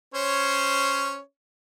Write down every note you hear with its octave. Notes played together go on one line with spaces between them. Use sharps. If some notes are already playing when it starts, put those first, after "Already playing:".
C#4 C5 C#5